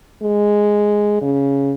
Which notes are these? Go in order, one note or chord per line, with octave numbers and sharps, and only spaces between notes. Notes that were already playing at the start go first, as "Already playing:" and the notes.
G#3
C#3